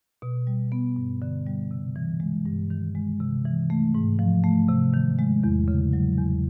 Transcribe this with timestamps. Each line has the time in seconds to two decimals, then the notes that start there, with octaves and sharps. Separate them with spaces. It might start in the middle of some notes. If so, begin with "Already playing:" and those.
0.22 B2
0.47 G3
0.72 B3
0.96 G2
1.22 D3
1.46 G3
1.71 C3
1.96 E3
2.20 G#3
2.45 G2
2.70 D#3
2.95 G#3
3.20 C3
3.45 E3
3.70 A3
3.95 G#2
4.19 F3
4.44 A3
4.69 C3
4.93 D#3
5.19 G#3
5.44 E2
5.68 C#3
5.93 F#3
6.18 E2